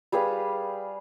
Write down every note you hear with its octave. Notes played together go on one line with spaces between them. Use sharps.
G3 G#4 B4 F5